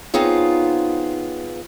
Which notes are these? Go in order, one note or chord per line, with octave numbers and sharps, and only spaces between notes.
B3 C4 D#4 F4 G#4 C#5